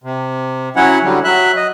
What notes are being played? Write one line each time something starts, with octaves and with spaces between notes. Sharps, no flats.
C3
F#3 C#4 E4 C#5 F#5
D3 F#3 G3
F#3 E5 F#6
D#5